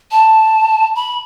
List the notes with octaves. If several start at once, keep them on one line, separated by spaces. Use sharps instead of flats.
A5
B5